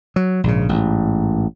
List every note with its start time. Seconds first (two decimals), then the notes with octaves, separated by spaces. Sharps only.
0.16 F#3
0.44 A#1 G#2 C#3
0.69 A1 G#2